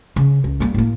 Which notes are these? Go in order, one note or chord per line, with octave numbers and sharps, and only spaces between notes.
C#3
C#2
G3 A#3
A2 A#3